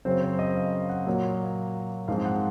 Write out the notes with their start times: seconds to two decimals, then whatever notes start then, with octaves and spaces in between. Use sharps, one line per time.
0.05 F#2 C#3 F#3 C4 C5
0.22 C5
0.39 D#5
0.56 F5
0.89 F#5
1.07 A#2 F#3 A#3
2.08 G#2 F3 G#3 C4 F5
2.25 F#5